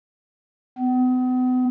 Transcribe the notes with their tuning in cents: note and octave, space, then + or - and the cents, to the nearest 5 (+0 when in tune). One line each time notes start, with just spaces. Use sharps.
B3 +40